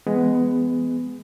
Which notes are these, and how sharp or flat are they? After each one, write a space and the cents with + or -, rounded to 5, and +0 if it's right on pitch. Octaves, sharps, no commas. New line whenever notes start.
E3 +35 G#3 +0 B3 +15